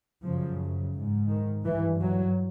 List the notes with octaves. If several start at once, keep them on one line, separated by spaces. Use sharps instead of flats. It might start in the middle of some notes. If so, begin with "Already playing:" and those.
F#2 C#3 F3
G#2
D#3
G2 E3
F#3